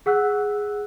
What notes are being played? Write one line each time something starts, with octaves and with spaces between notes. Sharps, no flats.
G#4 F#5 E6 F#6